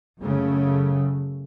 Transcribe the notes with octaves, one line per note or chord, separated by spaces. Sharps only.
F#2 C#3 A3